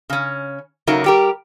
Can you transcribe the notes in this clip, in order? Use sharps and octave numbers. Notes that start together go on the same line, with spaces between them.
C#3 C#4
C#3 F#3 D#4 A#4 E5
G3 G4 A#4